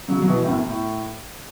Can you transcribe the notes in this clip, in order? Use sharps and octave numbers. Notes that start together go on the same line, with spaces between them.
C#3 F#3
F#3
B2 E3
A2
F#2
A2